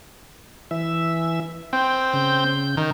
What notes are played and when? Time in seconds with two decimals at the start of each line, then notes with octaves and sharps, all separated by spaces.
0.71 E3 E5
1.73 C4 G5
2.14 C#3 G6
2.77 D#3